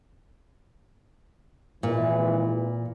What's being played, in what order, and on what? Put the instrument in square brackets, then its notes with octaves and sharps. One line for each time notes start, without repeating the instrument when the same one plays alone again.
[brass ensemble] G#1 E3 [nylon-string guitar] A#2